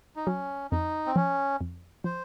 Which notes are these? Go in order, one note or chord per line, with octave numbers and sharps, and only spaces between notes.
D#4
F#3 C#4
F2 D#4
C4
F3 C#4
F2
F3 C5